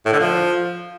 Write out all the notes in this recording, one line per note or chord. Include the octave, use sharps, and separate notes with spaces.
A2
D3
F3